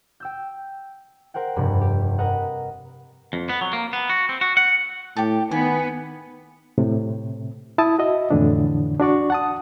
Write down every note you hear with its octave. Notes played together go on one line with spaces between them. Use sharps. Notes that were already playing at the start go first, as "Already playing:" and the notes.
G5 E6 G6
A#4 C5 F#5 G5
F1 G2 C3 B5
G4
A#4 B4 D#5 F#5
F2
B3
F#3
A#3
B3
F#4
C4
F#4
F#5
A2 G4 G5 A5
D#3 B3 G#5
A2 C3
E4 A5 D#6
F#4 D#5 E5
F2 A2 D3 E3 D4
D4 F#4 D5 C#6
F#5 A5 D#6